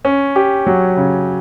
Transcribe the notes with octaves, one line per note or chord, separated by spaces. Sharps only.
C#4
G4
F#3
C#3